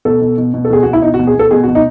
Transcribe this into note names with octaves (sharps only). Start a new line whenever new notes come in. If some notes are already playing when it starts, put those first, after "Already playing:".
B2 A4
B2
B2
B2
A4
B2 G#4
B2 F#4
E4
B2 D#4
F#4
B2
G#4
B2 A4
B2 G#4
F#4
B2
D#4